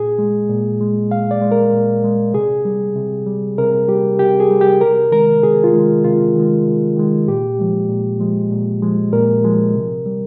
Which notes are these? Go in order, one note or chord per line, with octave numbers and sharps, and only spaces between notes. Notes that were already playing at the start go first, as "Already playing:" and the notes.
Already playing: A#2 G#4
G#3
A#2
G#3
A#2 F5
D5
G#3
A#4
A#2
G#3
C3 G#4
G3
C3
G3
C3 A#4
G3 G4
C3 G4
G#4
G3
G4
C3 A#4
D#3 G#3 A#4
C3 G#4
F4
D#3 G#3
C3 F4
D#3 G#3
C3
D#3 G#3
A#2 G4
F3 G#3
A#2
F3 G#3
A#2
F3 G#3
A#2 A#4
F3 G#3
C3
G3